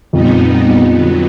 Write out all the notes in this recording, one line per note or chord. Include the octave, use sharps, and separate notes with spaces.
F2 A#2 G3 B3 D#4
D3 F#3 B3